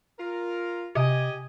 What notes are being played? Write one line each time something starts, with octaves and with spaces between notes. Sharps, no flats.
F4 A#4
C3 G4 D#5 G#5